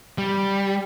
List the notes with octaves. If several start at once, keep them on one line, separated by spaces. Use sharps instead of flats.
G3